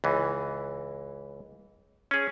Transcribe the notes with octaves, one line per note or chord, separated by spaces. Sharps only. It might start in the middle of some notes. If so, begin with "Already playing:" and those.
C#2 E3
C#4 G#4